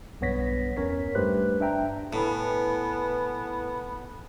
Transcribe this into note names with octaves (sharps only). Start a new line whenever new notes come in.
B1 G2 B3 C#5 A#6 B6
E2 C#4 A#4 C#5 B6
G2 A3 G4 B4 C5 F#6
D4 E5 G5 A#5
A2 B3 E4 B4 G#5